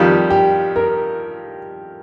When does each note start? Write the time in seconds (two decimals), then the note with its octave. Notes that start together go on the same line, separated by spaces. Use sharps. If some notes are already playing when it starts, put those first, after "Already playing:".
Already playing: F2 D#3 G3 F4
0.30 G4
0.76 A#4